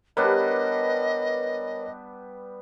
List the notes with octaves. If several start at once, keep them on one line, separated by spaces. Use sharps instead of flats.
G3 B3 D4 A#4 B4 C#5 D#5